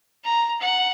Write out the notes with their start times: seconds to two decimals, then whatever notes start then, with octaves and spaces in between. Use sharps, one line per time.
0.24 A#5
0.61 F#5